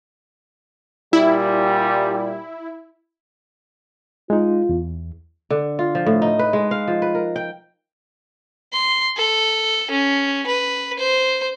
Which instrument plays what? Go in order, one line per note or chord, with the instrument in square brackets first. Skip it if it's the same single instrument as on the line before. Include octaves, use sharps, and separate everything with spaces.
[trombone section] A#2 G3 [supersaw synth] E4
[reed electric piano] G#3 D#4 [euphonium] F4
[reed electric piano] E2
[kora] D3
F4
F3
A2
D#4
B4
G#3
F5
F3
B4
A#4
G5
[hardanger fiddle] C6
A4
C#4
B4
C5